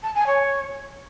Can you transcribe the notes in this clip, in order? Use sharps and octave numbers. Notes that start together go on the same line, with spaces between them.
A5
G#5
C#5